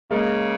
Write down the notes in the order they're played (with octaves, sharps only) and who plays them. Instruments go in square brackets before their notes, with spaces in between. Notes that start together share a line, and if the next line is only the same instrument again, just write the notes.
[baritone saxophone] C#3 [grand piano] G#3 A#3